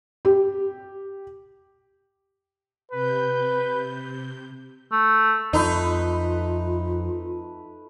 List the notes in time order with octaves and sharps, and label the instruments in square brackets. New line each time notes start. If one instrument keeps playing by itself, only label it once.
[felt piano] G4
[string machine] C3 G6 [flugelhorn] B4
[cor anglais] A3
[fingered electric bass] F2 F3 [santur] A3 B4 [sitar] D#4 [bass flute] F4